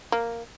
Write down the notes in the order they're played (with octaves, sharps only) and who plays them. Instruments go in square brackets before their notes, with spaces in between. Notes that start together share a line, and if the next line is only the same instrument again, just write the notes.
[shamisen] A#3